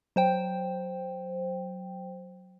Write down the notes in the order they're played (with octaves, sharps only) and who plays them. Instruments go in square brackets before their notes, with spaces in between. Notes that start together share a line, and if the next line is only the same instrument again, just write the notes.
[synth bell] F#3 C5 G5